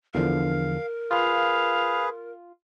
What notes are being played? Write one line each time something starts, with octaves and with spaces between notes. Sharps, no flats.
E2 D3 F3 A#4 F5
F4 G#4 B4 F5